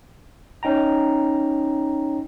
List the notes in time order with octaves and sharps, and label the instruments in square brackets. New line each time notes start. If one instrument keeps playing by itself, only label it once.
[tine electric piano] C#4 D#4 G5 A#5